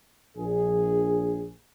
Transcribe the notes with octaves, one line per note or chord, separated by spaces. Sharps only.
A#1 G#4